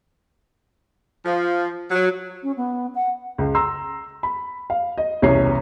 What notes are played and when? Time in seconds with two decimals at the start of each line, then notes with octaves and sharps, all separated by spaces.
1.25 F3
1.91 F#3
2.43 C#4
2.57 B3
2.95 F#5
3.38 C#2
3.55 A#5 C6 E6
4.23 B5
4.70 F5
4.98 D#5
5.22 E1 C2 C#4 C#5 C7